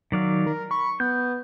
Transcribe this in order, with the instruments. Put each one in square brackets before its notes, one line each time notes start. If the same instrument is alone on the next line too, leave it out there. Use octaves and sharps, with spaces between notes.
[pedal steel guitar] D#3 D5 F5 [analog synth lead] F#3
[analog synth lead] A#4
[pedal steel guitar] B5 [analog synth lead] C#6
[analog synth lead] B3 [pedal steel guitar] G6